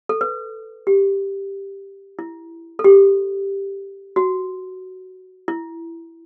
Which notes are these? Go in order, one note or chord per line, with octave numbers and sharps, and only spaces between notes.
A4
B4
G4
E4
A4
G4
F#4
E4